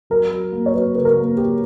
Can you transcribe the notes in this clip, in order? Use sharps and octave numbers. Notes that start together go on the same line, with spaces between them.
F#3 A#4
F#3
A#3
C#5
F#3 B4
C#3 B4
A#4
A#3
F#3 G4